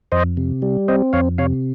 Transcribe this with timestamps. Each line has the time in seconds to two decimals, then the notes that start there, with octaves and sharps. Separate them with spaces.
0.12 F2 C5 D#5
0.37 C3
0.62 G3
0.88 C4 C5 D#5
1.13 F2 C#5 F5
1.38 C3 C#5 F5